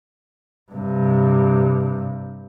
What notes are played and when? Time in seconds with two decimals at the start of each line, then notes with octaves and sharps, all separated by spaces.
0.72 G2 C3